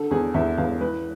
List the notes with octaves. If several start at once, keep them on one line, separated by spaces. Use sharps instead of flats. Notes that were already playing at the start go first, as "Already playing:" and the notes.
Already playing: D3 A4
E2 G#4
E2 E5
E2 F5
E3 B4